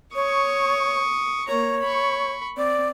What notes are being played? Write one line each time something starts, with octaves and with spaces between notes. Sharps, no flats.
C#5 C#6 D#6
A#3 C#5 A#5
B5 C#6
C4 D5